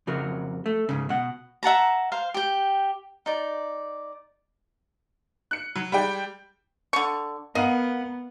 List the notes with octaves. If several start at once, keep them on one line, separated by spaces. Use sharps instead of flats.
F2 C#3 F#4 A#4
A3
G#2 C#3
B2 F#5
E5 F#5 A5 A#5
C5 F5
G4 G5
D#4 D5
F#6 C#7
F#3
G3 G#3 D5 G5
D3 C#6
B3 A#4 D#5 F5 F#5